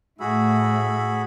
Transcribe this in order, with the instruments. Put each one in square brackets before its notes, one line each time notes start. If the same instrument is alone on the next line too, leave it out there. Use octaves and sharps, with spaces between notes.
[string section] A2 [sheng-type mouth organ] F#4 G#4 B5 [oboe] E5